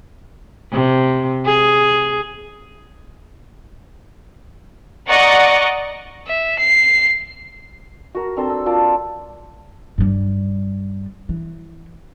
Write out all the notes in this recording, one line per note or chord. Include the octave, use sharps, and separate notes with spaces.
C3
G#4
D5 D#5 F#5 A#5 C#6 A#6
E5
C7
F#4 A#4
C4 D4 A4 C5
E6
A#3 F4 D5 A5
G2 G3
E3